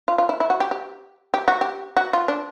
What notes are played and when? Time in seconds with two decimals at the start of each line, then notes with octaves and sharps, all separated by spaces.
0.08 F4
0.18 F4
0.29 E4
0.40 E4
0.50 F#4
0.60 G4
0.71 G4
1.34 G4
1.48 F#4
1.61 G4
1.97 F#4
2.13 F4
2.28 D4